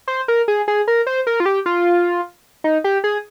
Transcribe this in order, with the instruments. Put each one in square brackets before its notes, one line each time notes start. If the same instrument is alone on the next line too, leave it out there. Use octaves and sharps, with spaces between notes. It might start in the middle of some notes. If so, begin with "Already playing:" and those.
[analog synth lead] C5
A#4
G#4
G#4
A#4
C5
A#4
F4
G4
F4
D#4
G4
G#4